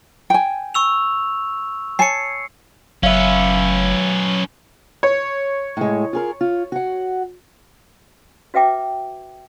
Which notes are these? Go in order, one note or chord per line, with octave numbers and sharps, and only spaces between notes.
G5 G#5
C#6 E6 F7
C#5 G#5 A5 C7 C#7
F#1 F#3 C#4 B4 E5 F5
C#5
A2 G#3
F4 G#4 A#4
F4
F#4 F#5
F#4 B4 E5 G5 D6